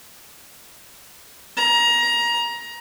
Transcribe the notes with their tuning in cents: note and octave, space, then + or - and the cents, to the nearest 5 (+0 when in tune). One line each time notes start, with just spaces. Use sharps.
A#5 +20